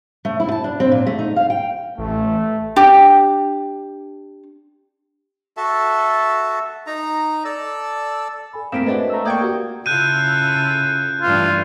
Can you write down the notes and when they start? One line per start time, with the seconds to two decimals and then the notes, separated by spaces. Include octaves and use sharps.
0.25 A3
0.40 E4
0.52 A5
0.64 D4
0.80 C4
0.92 A#2
1.07 A3
1.19 D#4
1.36 F5
1.50 G5
1.98 A1 A3
2.76 D4 G4
5.57 F#4 A4 E5 A5
6.87 D#4 A#5
7.45 A4 D5 A5 E6
8.53 A4 G#5 B5
8.72 A2 A3 A#3 C4 F5 B6 D7 E7
8.86 G#3 D4 F#4 A4 B4 C5 E5
9.10 A3 A#5 E6
9.25 A#3 D5 G5 C#6 D#6 G6 G#6
9.41 F#4 G4
9.86 C#3 E4 F4 A4 F#6 G6 D#7
11.22 G2 E3 A3 F4